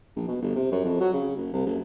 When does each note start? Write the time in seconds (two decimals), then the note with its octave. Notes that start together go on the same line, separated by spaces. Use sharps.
0.16 A#1
0.28 B2
0.42 G1
0.56 C3
0.72 F#2
0.84 F2
1.00 F#3
1.14 C#3
1.37 F#1
1.53 C2
1.66 F#1